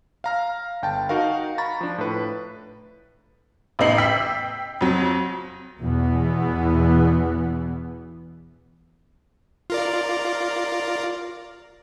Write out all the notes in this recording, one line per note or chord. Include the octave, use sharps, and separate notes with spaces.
F5 A#5 F6
G1 G5 A5
D#4 F#4 A#4 F5
A#5 B5 C#6 A6
F3 D4
A2 B4
A1 B3 D#4 C7 F#7
G5 E6 B6
F2 F#3
E2 B2 E3 B3
F4 A#4 D5